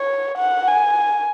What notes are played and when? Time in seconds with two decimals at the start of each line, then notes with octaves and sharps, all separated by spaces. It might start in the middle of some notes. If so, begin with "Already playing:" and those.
Already playing: C#5
0.38 F#5
0.68 G#5